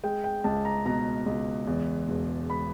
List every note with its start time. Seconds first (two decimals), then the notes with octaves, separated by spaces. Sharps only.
0.04 G#3 G5
0.24 G5
0.44 C#2 A5
0.65 A#5
0.86 B2 A#5
1.26 C#2
1.67 E2
2.09 E1
2.50 B5